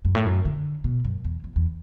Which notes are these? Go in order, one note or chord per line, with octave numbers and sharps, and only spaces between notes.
F#2
A2
F#2
D3
B2
F#2
E2
E2
E2